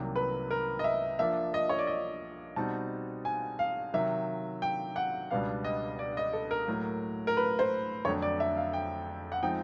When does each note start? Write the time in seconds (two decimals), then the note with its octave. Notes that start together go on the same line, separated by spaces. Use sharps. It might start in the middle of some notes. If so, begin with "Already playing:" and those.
Already playing: C2 C3 D#3 F#3 A#3
0.16 B4
0.51 A#4
0.79 D#5
0.84 E5
1.19 F3 A#3 D4 E5
1.54 D#5
1.69 C#5
1.79 D5
1.87 D#5
2.56 B2 G3 C4 D#4 F#4 A5
3.25 G#5
3.59 F5
3.93 C3 D#3 F#3 E5
4.62 G5
4.96 F#5
5.30 C#2 B2 G3 B3 D4 F5
5.64 D#5
5.99 D5
6.17 D#5
6.33 A4
6.51 A#4
6.68 A2 F#3 A#3
7.27 A#4
7.37 B4
7.59 C5
8.05 F2 D3 F#3 A3 C#5
8.22 D5
8.40 E5
8.57 F5
8.73 G5
9.32 F#5
9.42 F3 G#3 C4 D#4 G5